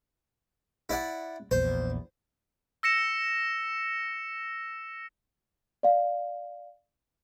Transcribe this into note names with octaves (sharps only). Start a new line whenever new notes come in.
E4 D5 F#5
A#1 E2 C5
E6 A#6 C#7 E7
D5 F5